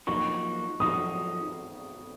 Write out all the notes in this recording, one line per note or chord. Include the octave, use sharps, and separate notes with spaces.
F#2 F3 A#3 D#4 F#4 C#6
F#2 F3 A#3 D#4 F#4 D#6